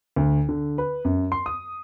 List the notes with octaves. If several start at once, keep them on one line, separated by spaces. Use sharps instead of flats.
D2
D3
B4
F#2
C6
D#6